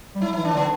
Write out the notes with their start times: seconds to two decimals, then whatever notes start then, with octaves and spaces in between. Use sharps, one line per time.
0.15 G3
0.22 F#3 E4
0.33 E3 E4
0.45 D4
0.52 D3 B3